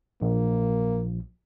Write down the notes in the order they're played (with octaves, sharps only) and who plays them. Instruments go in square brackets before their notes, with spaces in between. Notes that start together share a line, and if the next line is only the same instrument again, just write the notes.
[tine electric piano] A#1 [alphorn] A#3